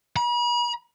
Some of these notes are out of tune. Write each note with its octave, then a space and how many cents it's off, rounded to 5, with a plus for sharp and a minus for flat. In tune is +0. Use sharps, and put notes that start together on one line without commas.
B5 -45